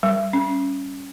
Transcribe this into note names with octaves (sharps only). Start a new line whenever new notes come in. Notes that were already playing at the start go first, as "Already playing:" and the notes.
G3
C#4